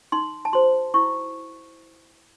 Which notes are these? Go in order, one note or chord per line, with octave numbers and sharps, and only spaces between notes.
D#4 C6
A5
F#4 C5 C6
E4 C#6